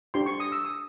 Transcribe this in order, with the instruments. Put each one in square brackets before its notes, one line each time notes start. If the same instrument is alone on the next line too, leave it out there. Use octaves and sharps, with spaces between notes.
[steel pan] D4 G4 C5 C6
C#6
D#6
E6
D#6